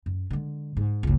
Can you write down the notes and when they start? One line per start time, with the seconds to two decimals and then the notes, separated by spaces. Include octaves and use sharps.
0.06 F#2
0.30 D3 G#3
0.77 G#2
1.03 F#1 C#2